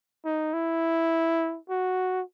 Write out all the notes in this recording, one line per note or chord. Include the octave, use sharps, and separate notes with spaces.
D#4
E4
F#4